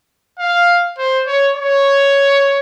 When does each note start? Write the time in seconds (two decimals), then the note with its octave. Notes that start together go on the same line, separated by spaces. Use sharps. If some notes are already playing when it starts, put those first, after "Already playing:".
0.39 F5
0.98 C5
1.27 C#5
1.56 C#5